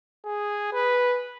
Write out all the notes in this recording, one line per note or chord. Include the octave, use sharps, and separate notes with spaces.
G#4
B4